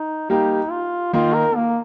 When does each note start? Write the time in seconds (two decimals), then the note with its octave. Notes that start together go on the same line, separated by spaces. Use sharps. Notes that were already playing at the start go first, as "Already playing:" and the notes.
Already playing: D#4
0.29 G3 A#3 D#4 G4
0.71 F4
1.13 D#3 A#3 D#4 F4
1.34 A#4
1.55 A#3